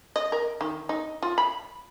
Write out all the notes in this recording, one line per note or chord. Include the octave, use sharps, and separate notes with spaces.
D#5
A#4
D#3
D#4
F4
B5